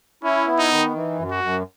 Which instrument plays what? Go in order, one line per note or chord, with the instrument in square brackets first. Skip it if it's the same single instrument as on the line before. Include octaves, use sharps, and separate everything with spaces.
[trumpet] C#4 [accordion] E4
[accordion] B3
[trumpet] D#4
[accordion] D#3
E3
F#2
[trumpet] F#4
[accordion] F#2